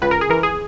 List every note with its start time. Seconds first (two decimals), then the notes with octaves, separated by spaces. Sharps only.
0.02 C#2 B4
0.11 A#4
0.21 G#4
0.29 E3 A#4
0.43 G#4